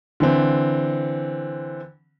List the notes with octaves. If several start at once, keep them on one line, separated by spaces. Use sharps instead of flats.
D3 E3 C4